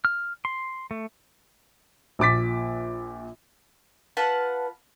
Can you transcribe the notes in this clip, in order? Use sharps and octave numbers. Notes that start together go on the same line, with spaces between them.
F6
C6
A3
A#1 A#2 D6 A6 B6
F4 B4 F#5 A5